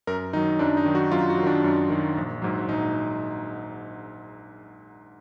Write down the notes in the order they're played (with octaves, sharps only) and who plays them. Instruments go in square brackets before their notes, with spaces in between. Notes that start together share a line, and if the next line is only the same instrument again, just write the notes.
[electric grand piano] F#2 A#4
D#3 F#3 D#4
F#2 D4
D#4
D#3 F#3
F#4
F#2 F4
F#4
F#3
D#3 D4
F#2
D#3 F#3
A#1
G#2 F#3
A#1 D#4